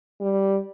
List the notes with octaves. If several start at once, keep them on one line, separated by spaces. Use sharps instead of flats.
G3